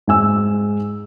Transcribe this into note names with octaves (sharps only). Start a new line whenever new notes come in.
G#2 G#3 G#5 E6